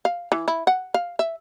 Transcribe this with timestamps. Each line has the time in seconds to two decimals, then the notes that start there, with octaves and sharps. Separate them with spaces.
0.05 F5
0.32 E3
0.48 E4
0.67 F#5
0.94 F5
1.19 E5